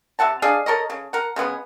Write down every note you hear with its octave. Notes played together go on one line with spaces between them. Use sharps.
C3 E5 F#5 A5
D4 G#4 D#5 F5
A4 A#4 C#5 D#5
C#3
A#4 F#5
C#3 G#3 B3 G#4